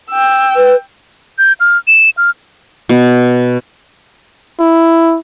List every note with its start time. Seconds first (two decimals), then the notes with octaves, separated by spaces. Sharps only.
0.10 G5 E6
0.56 B4
1.39 G6
1.60 F6
1.87 E7
2.17 F6
2.89 B2
4.60 E4